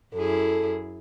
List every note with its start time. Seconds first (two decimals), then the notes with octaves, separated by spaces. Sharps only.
0.14 F#2 E4 G#4 A4